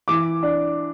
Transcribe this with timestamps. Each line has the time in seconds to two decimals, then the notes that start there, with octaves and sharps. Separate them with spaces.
0.08 E3 D6
0.43 D4